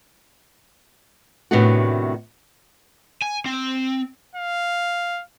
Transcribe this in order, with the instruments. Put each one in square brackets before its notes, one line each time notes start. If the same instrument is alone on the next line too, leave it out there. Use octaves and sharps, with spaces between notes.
[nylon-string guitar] A2 C3 D#3 B3 D4 F#4
[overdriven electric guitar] G#5
C4
[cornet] F5